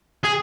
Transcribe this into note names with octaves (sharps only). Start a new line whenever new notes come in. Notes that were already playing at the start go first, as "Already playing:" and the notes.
G#4